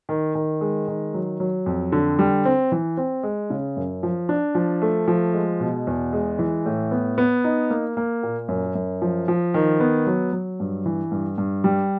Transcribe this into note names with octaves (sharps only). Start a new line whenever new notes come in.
D#3
D#3
G#3
D#3
F#3
F#3
F2
D3
G3
C4
E3
C4
G#3
C#3
F#2
F3
D4
F3
A3
F3
G#3
B2
E2
G#3
E3
A2
B3
B3
D#4
A#3
A#3
A#2
F#2
F#2
F3
F3
D#3
B3
F#3
F#3
G2
E3
G2
G2
G3